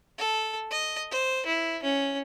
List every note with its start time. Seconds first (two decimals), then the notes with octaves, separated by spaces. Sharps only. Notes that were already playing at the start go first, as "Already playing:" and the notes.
0.18 A4
0.70 D#5
1.11 C5
1.46 E4
1.83 C#4